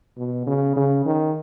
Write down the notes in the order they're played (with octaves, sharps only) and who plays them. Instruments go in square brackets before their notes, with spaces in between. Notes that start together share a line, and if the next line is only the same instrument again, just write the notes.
[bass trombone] B2
C#3
C#3
D#3